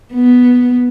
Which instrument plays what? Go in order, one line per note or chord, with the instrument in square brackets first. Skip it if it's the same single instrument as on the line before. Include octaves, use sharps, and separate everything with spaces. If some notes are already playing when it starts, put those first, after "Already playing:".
[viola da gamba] B3